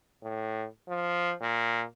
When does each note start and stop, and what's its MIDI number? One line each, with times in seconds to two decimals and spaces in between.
0.23 0.66 45
0.88 1.33 53
1.41 1.84 46